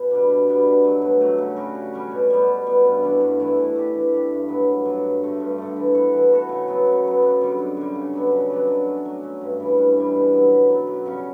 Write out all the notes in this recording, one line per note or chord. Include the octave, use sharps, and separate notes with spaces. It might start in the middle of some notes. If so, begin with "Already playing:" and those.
Already playing: B2
G3 B3 D4
B2
G3 B3 D4
B2
F#3 A3
B2
F#3 A3
C#3
G3 C#4 F#4
C#3
G3 C#4 F#4
B2
G3 B3
B2
G3 B3
G2
E3 A3 D4
G2
E3 A3 D4
E3
A3 D4 G4
E3
A3 D4 G4
G2
F#3 B3
G2
F#3 B3
G2
D3 A3
G2
D3 A3
E3
B3 F#4 A4
E3
B3 F#4 A4
C#3
F#3 B3
C#3
F#3 B3
F#2
D3 G3
F#2
D3 G3
C#3
F#3 B3 D4
C#3
F#3 B3 D4
F#3
A3 C#4
F#3
A3 C#4
G2
E3 G3
G2
E3 G3
B2
F#3 B3
B2
F#3 B3
F#2
C#3 G3 C#4